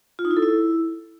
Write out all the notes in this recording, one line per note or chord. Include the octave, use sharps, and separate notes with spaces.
F4
D#4
E4
A4
E4